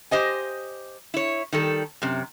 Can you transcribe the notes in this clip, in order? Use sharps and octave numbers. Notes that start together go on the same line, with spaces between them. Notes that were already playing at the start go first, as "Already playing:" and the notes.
G4 C5 D#5 G#5
E4 C#5
D#3 G3 A4
F#2 C3